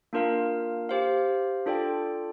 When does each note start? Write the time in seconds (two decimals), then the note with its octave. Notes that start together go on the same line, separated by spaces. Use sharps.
0.13 A#3 D4 F4 A#4 F5
0.89 G4 C5 F5
1.66 D4 F4 A4 D5 G5